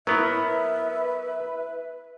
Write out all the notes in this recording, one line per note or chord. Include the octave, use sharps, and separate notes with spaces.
F#3 B3 E4 A#4 B4 E5